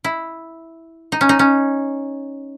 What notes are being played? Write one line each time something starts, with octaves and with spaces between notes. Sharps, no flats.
E4
D#4
C#4
D#4
C#4